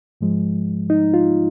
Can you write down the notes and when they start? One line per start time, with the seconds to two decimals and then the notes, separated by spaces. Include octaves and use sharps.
0.21 G#2 F3 G#3
0.90 D#4
1.14 F4